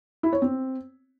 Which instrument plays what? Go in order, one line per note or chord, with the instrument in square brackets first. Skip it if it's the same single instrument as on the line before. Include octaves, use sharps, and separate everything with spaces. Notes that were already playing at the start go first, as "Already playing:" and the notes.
[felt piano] E4
C#5
C4